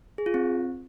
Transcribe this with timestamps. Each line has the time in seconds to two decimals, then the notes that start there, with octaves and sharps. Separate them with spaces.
0.18 G#4
0.26 F4
0.34 C4